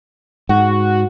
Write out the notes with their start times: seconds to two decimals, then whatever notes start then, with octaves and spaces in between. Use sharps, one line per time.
0.49 G#2 F#4